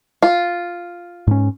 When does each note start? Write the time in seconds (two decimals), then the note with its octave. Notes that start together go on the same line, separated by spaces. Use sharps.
0.23 F4
1.27 G#2 C#4